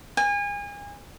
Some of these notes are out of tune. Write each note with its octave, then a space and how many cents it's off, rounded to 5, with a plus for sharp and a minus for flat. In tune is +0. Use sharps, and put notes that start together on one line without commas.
G#5 -35